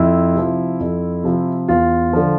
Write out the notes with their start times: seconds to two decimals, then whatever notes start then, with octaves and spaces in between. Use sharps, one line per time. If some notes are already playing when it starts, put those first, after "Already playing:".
Already playing: F2 E4
0.35 C3 F3
0.80 F2
1.24 C3 F3
1.68 E2 F4
2.13 D3 F3